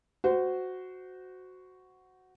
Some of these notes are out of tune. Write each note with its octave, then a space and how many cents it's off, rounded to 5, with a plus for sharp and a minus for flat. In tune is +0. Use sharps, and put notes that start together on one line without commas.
F#4 +0 C5 -20